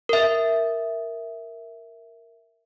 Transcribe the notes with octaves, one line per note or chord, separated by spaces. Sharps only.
A#4 E5